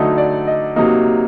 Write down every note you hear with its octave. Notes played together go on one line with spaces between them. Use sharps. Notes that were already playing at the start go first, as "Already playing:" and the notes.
Already playing: D3 F#3 A3 D#4
D5
D#5
C3 F#3 A#3 D#4